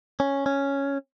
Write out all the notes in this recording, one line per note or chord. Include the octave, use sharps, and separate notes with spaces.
C#4
C#4